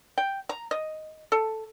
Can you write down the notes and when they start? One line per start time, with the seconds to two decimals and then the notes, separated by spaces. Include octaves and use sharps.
0.18 G5
0.49 A#5
0.71 D#5
1.32 A4